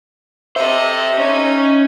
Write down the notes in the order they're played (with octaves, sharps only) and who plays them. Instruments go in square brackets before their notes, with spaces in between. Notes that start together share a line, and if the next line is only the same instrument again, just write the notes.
[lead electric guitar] G4 C5 [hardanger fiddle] A4 D#5 [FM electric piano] E5
[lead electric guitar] C#4 C#5 [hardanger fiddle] D#4